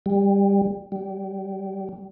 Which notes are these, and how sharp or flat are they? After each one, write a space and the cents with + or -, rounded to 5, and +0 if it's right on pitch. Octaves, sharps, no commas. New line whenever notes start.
G3 +20
G3 -20